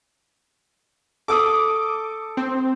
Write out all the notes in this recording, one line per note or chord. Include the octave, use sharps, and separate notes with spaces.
A4 D6 D#6
C4